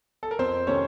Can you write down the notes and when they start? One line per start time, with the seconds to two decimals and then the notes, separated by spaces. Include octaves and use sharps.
0.23 A4
0.31 A#4
0.39 F2 C4 C5
0.67 C3 D#3 A3 C#4 C#5